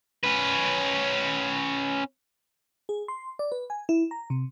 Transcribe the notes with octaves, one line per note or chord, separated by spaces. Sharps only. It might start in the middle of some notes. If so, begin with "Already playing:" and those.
C#4 B4
G#4
C6
D5
B4
G#5
E4
A#5
C3